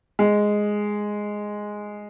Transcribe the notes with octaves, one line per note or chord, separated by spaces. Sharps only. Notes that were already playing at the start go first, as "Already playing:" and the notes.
G#3